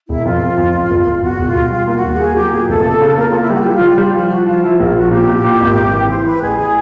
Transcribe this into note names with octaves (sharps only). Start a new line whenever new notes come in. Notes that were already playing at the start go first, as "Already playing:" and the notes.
E1 E4
F2 F4
F2
F2
F#1
F#1
F#1
E2 F#4
E1
F4
E1
G3 F4
A#3 F4
F#4
D#2
G4
A#3 G#4
F#3 G4
A#2 G#4
F1 A4
C#3
C#3
A#3 A#4
A#3 F4
E4
G3 F#4
F4
G3 E4
F4
G3
G3
F3 F4
F3 F#4
F3 F4
F3 E4
A#1 F4
F3 F#4
A#2 G4
A#2
A#2
G#1
G#1
E3
E3 C5
E3 B4
A1 G#4
E3 G#4